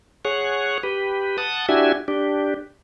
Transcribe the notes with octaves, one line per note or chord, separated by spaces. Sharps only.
G#4 C#5 F#5
G4 B4
F#5 A5 D#6
D4 E4 F#4 G4 E5 G#5
D4 G4